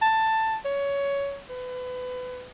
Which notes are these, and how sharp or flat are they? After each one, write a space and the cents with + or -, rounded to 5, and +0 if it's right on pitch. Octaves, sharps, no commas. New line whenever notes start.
A5 +10
C#5 +15
B4 +30